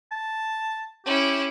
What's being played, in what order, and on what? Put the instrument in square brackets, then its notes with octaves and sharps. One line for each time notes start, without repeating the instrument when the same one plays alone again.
[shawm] A5
[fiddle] C#4 E4 [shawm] G4